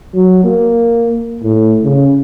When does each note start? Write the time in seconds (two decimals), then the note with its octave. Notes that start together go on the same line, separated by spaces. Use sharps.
0.14 F#3
0.44 A#3
1.43 A2
1.84 C#3